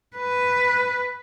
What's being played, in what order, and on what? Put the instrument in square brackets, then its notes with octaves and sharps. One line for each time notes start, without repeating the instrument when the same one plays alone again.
[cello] B4